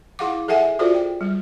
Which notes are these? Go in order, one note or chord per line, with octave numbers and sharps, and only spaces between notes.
E4 G#4 F5 F#5 D6
G#4 A4 E5 F#5 G#5
F4 F#4 G#4 A4 C5 D5
G5
G3